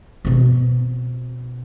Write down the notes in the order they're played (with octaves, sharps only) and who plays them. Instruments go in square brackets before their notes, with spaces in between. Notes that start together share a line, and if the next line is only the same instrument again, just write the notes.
[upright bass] B2 C4